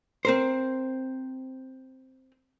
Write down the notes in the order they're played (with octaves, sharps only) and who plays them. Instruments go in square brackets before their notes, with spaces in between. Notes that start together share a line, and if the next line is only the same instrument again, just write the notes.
[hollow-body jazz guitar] C4 A#4 C5